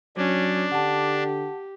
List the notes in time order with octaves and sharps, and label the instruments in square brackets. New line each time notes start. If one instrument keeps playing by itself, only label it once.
[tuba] F#3 [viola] C#4 [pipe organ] D4
[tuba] D3 [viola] G4 [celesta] F#5 A5